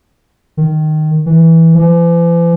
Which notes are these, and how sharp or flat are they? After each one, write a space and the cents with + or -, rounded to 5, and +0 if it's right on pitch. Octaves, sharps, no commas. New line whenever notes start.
D#3 -10
E3 -10
E3 +45